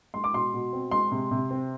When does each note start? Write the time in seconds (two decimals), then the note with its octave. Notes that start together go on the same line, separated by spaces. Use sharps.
0.14 G#3 C6
0.24 D6
0.34 B2 C6
0.54 B2
0.73 C4
0.91 G#3 C6
1.12 C3
1.31 C3
1.51 C4